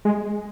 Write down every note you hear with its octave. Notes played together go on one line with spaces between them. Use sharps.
G#3